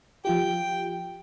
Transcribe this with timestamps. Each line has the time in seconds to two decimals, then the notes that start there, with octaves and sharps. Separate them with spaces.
0.25 F3 F4 G4 G5